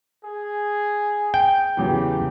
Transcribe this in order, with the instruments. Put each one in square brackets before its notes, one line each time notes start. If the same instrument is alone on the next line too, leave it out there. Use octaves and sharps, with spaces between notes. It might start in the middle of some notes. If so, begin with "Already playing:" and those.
[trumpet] G#4
[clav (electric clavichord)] G5
[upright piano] E2 C#3 F#3 [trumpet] G4